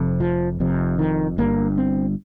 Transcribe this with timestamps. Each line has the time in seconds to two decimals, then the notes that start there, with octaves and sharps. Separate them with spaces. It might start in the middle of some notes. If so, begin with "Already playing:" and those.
Already playing: F1 F2 C3
0.20 F3
0.60 F1 F2 C3
0.99 D#3
1.38 G1 G2 A#3
1.78 C4